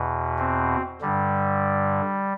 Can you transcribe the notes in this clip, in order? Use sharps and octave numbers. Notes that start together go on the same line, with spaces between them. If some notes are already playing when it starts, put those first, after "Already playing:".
Already playing: E2 B2
C4
G2 D3 G3